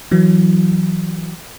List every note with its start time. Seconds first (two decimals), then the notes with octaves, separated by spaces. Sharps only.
0.11 E3 F#3